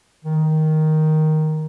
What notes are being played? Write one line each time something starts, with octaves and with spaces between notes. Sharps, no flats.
D#3